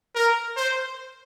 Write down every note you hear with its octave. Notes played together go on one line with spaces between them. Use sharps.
A#4
C5